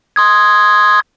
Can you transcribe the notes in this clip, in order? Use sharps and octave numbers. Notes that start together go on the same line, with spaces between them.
C6 D#6 G#6